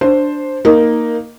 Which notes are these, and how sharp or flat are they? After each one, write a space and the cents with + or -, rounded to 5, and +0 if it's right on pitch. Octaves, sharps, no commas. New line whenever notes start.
D4 +0 C5 +0
A#3 +0 D#4 +0